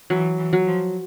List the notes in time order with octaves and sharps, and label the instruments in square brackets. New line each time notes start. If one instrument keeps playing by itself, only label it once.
[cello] E3 [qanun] F#3
[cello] E3
[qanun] F#3
[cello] F3